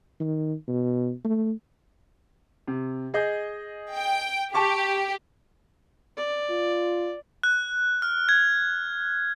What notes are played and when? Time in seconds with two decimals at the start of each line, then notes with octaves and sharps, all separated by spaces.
0.20 D#3
0.68 B2
1.24 A3
2.68 C3
3.14 G#4 D#5 G6
3.95 G5
4.54 G4 A5 C#6 D6
6.17 D5
6.50 F4
7.43 F#6
8.02 F6
8.29 G#6